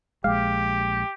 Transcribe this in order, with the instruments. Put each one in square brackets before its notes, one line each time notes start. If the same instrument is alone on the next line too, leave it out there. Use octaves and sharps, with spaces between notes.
[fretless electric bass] A#1 G#3 [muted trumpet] G4 [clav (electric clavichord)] F5